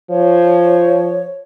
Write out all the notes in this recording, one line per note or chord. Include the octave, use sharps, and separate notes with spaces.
F3 C#5